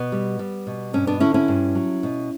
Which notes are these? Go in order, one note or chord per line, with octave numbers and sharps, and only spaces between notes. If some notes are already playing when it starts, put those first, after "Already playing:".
Already playing: B2 B3
G3
G3
B2
G2 C#4
B3 D4
D3 C#4 E4
C#4 E4
G2
F#3
B2